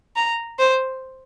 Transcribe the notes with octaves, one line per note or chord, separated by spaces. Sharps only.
A#5
C5